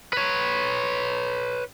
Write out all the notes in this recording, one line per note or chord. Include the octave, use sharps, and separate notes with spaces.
B4 C#5